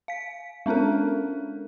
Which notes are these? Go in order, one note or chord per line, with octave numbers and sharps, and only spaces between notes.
F5 B6
G#3 C#4 D4 A4 A#4